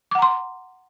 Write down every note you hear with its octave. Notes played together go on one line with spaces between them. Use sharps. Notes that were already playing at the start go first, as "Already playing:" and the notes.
F#5 A#5 C6 D6